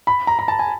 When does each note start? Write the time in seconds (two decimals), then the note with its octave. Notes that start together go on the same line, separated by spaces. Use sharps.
0.07 B5
0.27 A#5
0.39 A#5
0.48 A5
0.59 G#5